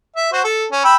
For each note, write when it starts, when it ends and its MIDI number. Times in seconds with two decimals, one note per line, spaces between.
0.16 0.27 76
0.32 0.41 66
0.32 0.41 72
0.44 0.66 69
0.72 0.82 61
0.84 0.96 79
0.84 0.96 83
0.84 0.96 88